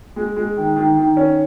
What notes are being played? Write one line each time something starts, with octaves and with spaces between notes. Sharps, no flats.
G#3
G#3
D#3
D#3
D#3
C#4